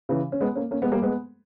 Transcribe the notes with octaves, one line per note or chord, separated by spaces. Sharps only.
C#3 E3
C#4
G#3 B3
A#3 C#4
A#3 C#4
G#3 B3
G3 A#3
G#3 B3